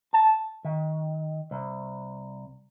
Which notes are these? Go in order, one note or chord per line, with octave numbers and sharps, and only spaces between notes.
A5
D#3
C2